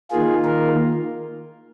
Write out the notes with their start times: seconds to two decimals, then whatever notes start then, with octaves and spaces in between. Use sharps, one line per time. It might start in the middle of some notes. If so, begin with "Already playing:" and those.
0.11 D#3 A#3 F4 G#4
0.45 A#4